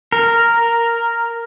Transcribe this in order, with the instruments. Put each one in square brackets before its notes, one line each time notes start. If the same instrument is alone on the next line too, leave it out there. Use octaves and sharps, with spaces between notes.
[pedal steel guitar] A#4